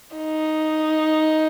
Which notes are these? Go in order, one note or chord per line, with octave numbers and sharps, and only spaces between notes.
D#4